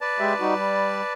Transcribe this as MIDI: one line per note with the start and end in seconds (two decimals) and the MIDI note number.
0.01 1.13 71
0.01 1.13 74
0.01 1.13 81
0.20 0.34 56
0.20 0.34 67
0.20 0.34 76
0.40 0.54 55
0.40 0.54 63
0.40 0.54 66
0.55 1.02 55